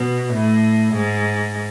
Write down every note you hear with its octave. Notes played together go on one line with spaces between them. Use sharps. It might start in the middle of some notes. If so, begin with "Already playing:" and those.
Already playing: B2
A2
G#2